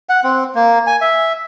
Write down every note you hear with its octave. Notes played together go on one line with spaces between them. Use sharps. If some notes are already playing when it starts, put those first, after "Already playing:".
F#5
C4
A#3
G#5
E5